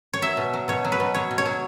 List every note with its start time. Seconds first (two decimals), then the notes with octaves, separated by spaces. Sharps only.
0.13 C#5
0.22 F#3 E5
0.37 B2
0.53 F#3
0.68 B2 C#5
0.85 F#3
0.92 B4
1.00 B2
1.14 F#3 C#5
1.31 B2
1.38 C#5
1.45 F#3